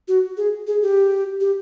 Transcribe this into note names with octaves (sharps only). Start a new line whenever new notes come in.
F#4
G#4
G#4
G4
G4